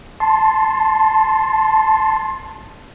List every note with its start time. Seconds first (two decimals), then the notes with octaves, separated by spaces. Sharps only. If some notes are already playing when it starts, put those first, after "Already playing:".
0.20 A5 C6